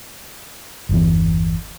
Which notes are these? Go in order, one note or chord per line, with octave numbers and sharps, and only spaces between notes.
G1 E2 E3